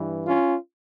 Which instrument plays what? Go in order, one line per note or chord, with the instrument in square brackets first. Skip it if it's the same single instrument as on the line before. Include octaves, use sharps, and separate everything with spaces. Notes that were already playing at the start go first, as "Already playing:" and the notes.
Already playing: [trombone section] G2 E3
C#4 F4